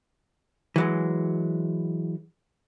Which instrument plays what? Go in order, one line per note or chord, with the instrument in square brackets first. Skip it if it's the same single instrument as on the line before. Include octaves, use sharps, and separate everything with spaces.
[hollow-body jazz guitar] E3 F#3 G#3